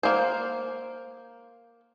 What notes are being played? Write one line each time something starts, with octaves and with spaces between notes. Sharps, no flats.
A#3 C5